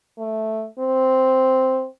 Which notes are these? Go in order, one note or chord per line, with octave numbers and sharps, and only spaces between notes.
A3
C4